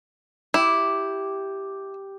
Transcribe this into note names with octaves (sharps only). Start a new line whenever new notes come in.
E4 G4